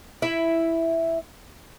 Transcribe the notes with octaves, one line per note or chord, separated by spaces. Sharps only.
E4 E5